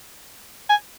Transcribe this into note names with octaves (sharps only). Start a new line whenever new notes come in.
G#5